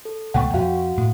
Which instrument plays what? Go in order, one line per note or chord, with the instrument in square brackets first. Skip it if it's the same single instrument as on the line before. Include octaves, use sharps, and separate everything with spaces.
[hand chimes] A4
[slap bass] C#2 B2 A3 [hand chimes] F#5 G5 C#6
[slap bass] F2 [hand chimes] F#4 F5 F#5
[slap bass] A2